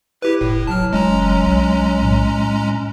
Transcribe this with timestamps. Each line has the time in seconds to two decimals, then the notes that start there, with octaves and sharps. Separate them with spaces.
0.22 E4 G4 B4
0.41 F#1 A2
0.67 F1 F#3 A5 F6
0.93 F#1 G#3 C#4 A#5
1.44 B1
2.02 A2